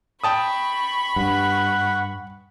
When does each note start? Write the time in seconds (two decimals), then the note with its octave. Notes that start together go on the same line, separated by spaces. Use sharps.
0.24 G5 A5 B5 C#6 D#6
1.16 G2 F#5